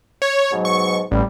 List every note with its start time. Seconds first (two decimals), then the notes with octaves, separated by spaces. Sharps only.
0.22 C#5
0.52 G#2 B2 F#3
0.65 C#6
1.11 A1 G3